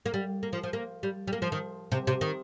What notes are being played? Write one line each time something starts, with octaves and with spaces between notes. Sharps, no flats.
A#3
G3
A#3
F3
F3
A#3
G3
G3
A#3
F3
D#3
C3
C3
D#3